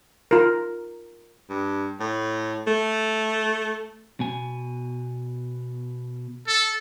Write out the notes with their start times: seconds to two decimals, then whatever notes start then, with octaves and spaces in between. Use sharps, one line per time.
0.31 F4 A#4
1.50 G2
2.00 A2
2.67 A3
4.20 B2 G#5
6.48 A4